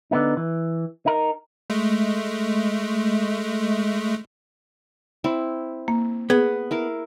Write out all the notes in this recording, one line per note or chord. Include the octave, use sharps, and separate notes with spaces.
D3 B3 D#4
E3
D#4 A#4
G#3 A3
C4 E4
A#3
B3 G#4
E4 A#4 F5